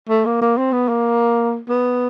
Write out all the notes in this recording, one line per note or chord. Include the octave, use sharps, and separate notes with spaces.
A3
A#3
A#3
C4
B3
A#3
B3